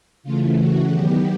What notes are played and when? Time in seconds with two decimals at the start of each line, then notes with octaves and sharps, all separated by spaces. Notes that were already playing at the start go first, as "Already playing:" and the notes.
0.23 C#3 E3 A3 F4
0.57 F#4
0.92 D#3 F#3 B3 G4